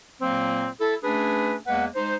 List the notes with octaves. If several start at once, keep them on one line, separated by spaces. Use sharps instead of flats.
A#2 F#3 A#3 C4
E4 A4
A3 C#4 D4 G#4 B4
E2 G#3 A#3 B4 F#5
G#3 D#4 C5